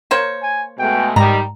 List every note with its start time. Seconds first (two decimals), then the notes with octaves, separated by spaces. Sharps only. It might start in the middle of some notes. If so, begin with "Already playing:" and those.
0.11 A#3 C5 C#5
0.42 G#5
0.79 B2 G#3 A3 G5
1.16 G#2 D#3 G3 D#4 A#5